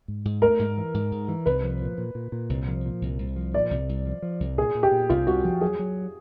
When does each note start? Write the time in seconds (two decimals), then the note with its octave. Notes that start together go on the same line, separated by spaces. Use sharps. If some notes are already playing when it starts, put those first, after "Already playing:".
0.08 G#2
0.25 G#2
0.42 A3 A#4
0.59 G#2
0.78 E3
0.94 G#2
1.12 G#2
1.28 E3
1.46 C2 B4
1.63 F3
1.81 A#2
1.98 A#2
2.15 A#2
2.32 A#2
2.49 C2
2.68 F3
2.85 A#2
3.01 C2
3.19 C2
3.36 F3
3.54 A#2 D5
3.71 C2
3.89 C2
4.06 F3
4.22 F3
4.40 C2
4.57 A#2 G#4
4.75 A#2
4.83 G4
4.92 A#2
5.09 C2 F4
5.27 C2 F#4
5.45 F3
5.61 F#3 G#4
5.79 F#3